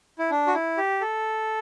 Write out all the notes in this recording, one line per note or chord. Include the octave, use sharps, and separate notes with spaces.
E4
D4
F#4
E4
G4
A4